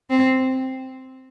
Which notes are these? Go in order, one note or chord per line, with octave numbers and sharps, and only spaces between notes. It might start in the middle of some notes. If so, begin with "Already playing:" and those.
C4